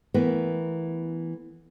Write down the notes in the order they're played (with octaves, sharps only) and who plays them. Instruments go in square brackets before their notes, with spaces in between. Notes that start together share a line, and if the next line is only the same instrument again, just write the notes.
[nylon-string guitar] E3 A3 B3 A#4